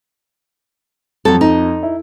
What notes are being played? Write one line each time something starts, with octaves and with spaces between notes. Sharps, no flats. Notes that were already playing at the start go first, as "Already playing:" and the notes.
F2 F#3 A4
D#4
E4